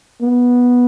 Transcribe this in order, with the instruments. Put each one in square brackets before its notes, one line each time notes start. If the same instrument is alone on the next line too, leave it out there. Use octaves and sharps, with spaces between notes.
[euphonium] B3